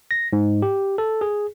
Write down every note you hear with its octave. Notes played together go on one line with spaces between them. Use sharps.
A#6
G#2
G4
A4
G#4